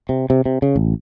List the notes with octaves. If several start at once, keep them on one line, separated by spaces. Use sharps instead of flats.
C3
C3
C3
C#3
A1